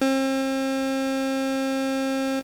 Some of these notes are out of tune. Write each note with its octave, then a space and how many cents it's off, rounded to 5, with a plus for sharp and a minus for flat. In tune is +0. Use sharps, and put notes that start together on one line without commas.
C4 +40